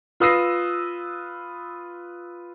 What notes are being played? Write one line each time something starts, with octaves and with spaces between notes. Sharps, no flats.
F4 B4 D#6 E6 A#6 C7